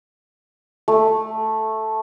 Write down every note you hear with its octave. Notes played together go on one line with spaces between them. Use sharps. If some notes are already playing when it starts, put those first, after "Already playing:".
A3